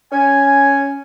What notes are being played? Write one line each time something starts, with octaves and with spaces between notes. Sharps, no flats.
C#4 G#5